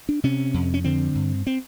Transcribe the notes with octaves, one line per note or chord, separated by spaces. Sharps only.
D4
C3 C#4
F2
C#4
D3 C4
G2
C4